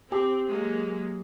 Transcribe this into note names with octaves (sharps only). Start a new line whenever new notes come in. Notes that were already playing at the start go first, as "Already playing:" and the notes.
C4 G4
F#3 G#3 A#3